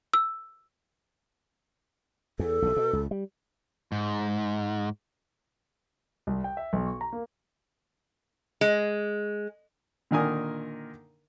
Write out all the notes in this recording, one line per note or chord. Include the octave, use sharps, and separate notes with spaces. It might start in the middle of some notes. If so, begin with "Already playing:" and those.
E6
E2 A4
B1 C3
B2
C#2
G3
G#2
C2
G5
E5
B1
C#6
A#5
A#3
G#3
A#2 D3 D#3 A#4 G#5 D#6